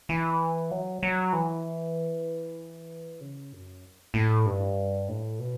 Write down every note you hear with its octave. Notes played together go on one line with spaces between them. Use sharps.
E3
F#3
F#3
E3
C#3
F#2
A2
G2
A2
B2